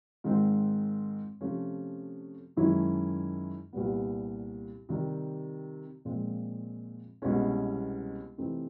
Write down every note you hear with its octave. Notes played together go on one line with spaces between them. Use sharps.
G#2 D#3 G#3 C4 F4
C3 F3 A3 C#4
F#2 D#3 G#3 C#4 E4
C2 A#2 G3 B3
C3 D#3 G3
A#2 F3 G#3 C4
C2 B2 G#3 C#4
C3 E3 A3 C4 D#4